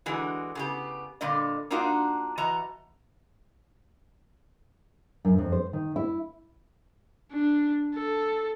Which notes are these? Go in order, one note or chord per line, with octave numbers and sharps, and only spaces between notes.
D3 E3 G#3 F#4
C#3 B3 G4
A#2 D3 G3 D5 D#5
A#3 D4 D#4 F4 F#4
E3 F#4 D#5 A5 A#5
F#2
F2
C5
D#3
E4
D4
A4